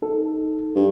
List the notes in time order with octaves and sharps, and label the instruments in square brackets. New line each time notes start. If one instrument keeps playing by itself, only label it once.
[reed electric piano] D#4 A4
[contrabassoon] G2